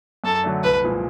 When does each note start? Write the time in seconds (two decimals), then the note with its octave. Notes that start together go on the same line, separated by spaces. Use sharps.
0.24 F#2 A4
0.44 D3 F#3 A3 D4
0.63 C2 B4
0.84 A#2 F3 G#3